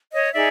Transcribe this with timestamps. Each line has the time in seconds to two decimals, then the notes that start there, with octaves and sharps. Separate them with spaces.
0.14 C#5 D#5
0.33 D#4 G#4 D5 E5